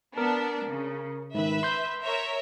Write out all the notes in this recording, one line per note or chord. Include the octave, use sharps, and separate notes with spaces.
B3 D4 A#4
C#3
G#2 D#3 B4 E5
C6 G6
A#4 C#5 E5